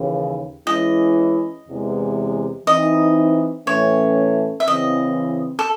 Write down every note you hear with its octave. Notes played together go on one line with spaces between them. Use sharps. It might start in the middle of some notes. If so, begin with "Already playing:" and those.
Already playing: D#2 C#3 E3
E3 G#3 C#4 E4 D#5
E2 C3 E3 G#3
E3 C4 D#4 D#5
A2 E3 A3 C#4 C#5
E5
C#3 E3 C4 D#5
A4